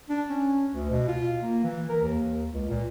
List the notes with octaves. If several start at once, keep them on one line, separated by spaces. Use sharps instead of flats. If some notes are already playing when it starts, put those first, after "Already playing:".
D4
C#4
D2
B2
F4
A#3
E3
A#4
D#2
C#2
A#2